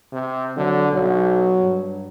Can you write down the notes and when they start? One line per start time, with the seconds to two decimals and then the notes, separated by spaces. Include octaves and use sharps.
0.12 C3
0.57 D3 F#3
0.92 B1 F#3
1.61 G2